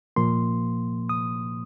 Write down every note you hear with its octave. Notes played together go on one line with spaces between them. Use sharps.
A#2 F3 A#3 C6
D#6